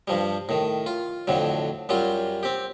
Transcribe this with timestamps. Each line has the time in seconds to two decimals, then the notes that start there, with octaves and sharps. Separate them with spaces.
0.08 G2 F3 G3
0.49 A2 D#3
0.86 F4
1.28 F2 A2 D3 F#3
1.89 F#2 F#3 G3 F4
2.43 C4 G4